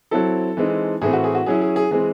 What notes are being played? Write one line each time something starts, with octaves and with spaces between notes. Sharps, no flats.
F#3 C4 E4 A4
E3 G#3 C4 D#4
A2 E3 A3 C4 G#4
F#4
G#4
F#4
F#3 C#4 E4 G#4
G#4
G#4
E3 G#3 C4 G#4